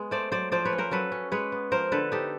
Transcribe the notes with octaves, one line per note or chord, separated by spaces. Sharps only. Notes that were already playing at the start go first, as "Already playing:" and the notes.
Already playing: G#3 B3
A3 C5 D5
F#3 C5 D5
F3 C5 D5
B4 C#5
C#4
A#4 C5
F#3 A4 B4
C#4
G#3 B4 C#5
B3
F3 A#4 C5
D3 A4 B4
D#4 G4 A4